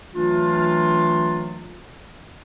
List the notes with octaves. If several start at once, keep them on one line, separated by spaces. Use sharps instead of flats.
E3 F#3 A3 D4 F4